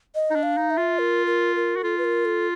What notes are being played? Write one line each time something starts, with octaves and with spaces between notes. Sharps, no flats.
D#5
D#4
D4
F5
D#4
E5
F4
A#4
A#4
A#4
F#4
F4 A4
B4
A#4
A4